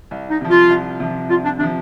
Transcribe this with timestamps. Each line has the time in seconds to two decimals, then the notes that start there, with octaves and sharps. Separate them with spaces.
0.11 C2
0.31 D#4
0.41 C3 F3
0.50 F4
0.69 C2
1.00 C3 F3
1.30 C2 F4
1.45 D4
1.59 C3 F3 D4